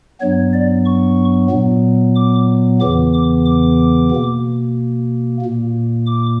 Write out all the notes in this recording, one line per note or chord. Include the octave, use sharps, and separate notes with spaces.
G2 F#3 B3 C#5
D5
C#6
A#2 F#3 B3
D6
E2 C#3 E3 B3 D6
D6
D6
B2 A#3
A#2 A#3
D6